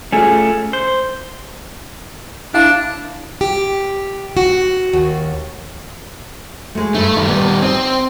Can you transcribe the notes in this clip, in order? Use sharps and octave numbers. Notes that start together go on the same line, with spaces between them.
A3 C#4 F4 G#4
C5
D4 E4 F5
G4
F#4
D#2
G#3 A3
G2 G3 A3 D#4
D#3 G3
B3
C4 D#5